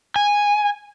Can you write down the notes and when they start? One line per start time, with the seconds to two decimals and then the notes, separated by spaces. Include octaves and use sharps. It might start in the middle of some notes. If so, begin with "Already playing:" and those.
0.16 G#5